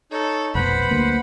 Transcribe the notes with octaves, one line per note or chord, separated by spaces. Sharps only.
D#4 A4 C#5
F1 B1 B4 C5 F#5 B5
D2 A#3